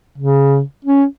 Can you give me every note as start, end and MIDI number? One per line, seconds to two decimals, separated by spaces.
0.18 0.61 49
0.85 1.05 61